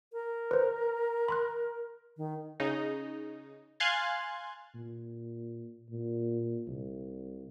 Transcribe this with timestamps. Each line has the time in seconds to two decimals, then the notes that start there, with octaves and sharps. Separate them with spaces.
0.13 A#4
0.51 B4 C5
1.28 B5 C6 F#6
2.17 D#3
2.60 C#3 D#4
3.80 F5 G#5 C6 F#6 G#6 A6
4.74 A#2
5.91 A#2
6.67 C2